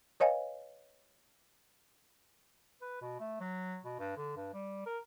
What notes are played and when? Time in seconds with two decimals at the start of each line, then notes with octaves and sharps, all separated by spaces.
0.20 B4 C#5 D#5 F5 G#5
2.81 B4
3.02 B2
3.20 A3
3.40 F#3
3.85 B2
3.99 G2
4.17 D3
4.36 G2
4.54 G3
4.86 A#4